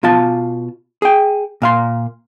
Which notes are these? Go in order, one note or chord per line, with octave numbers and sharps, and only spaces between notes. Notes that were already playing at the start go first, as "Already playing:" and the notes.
B2 F4 F5 A5
G#4 G5
A#2 F5 C6